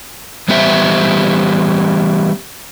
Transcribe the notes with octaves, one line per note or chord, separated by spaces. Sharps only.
E3 G3 B3 G4 C5 E5